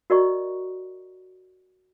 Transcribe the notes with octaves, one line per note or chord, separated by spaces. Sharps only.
F#4 A#4 D5 D#5 A#5 C#6